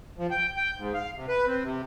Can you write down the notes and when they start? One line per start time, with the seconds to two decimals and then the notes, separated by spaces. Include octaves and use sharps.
0.18 F3
0.31 G5
0.56 G5
0.78 G#2
0.94 F5
1.15 C3
1.28 B4
1.47 C4
1.64 C3